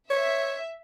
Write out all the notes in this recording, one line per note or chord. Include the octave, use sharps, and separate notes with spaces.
C#5 E5